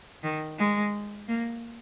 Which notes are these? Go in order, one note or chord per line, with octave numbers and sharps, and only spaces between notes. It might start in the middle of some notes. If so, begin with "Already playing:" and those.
D#3
G#3
A#3